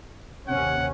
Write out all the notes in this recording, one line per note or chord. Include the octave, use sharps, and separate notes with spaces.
D#2 C3 C#4 F#5